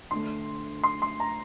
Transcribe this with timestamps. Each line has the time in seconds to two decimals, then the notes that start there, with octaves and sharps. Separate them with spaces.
0.11 D2 D3 A3 C6
0.83 C6
1.02 C6
1.20 A#5